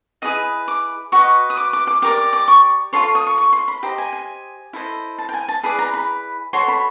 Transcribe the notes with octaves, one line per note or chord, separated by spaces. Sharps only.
E4 G#4 B4 D#5 D#6
D6
F#4 B4 D#5 C#6
D#6
D6
D6
D6
G4 A#4 D5 D6
D6
D6
C#6
F4 A4 C#5 C6
C#6
D#6
C#6
C#6
C6
B5
G4 C5 D#5 A#5
G#5
G#5
E4 A4 C5 D#5
A5
G5
G#5
A5
E4 G#4 B4 D5 B5
A#5
B5
F#4 A4 C#5 C6
B5